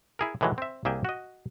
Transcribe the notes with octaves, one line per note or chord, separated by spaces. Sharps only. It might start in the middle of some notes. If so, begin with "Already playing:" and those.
E4 G#4 A#4
A2 D#3 E3 F#3 G#3
C4 E5
C2 A#3 G#4 E5 G5
F#4 D#5